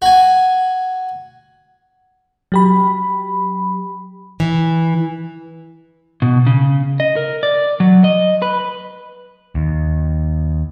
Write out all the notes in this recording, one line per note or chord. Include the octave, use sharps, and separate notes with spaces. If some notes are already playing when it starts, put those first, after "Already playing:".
F#4 G#5
F#3 G4 B5
E3
B2
C#3
D#5
A#4
D5
F#3
D#5
B4
D#2